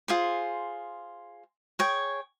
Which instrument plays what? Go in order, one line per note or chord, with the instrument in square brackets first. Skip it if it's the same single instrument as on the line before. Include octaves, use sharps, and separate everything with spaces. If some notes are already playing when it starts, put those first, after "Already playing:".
[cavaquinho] F4 G#4 C5
G#4 C#5 G5